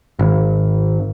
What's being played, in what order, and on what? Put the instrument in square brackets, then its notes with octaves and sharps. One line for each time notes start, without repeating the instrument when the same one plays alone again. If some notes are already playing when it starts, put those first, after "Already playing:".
[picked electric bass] G#1